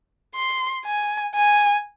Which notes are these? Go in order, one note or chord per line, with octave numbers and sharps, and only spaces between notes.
C6
G#5
G#5